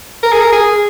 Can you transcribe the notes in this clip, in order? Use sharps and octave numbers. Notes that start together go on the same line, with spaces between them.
A#4
G#4
A#4
G#4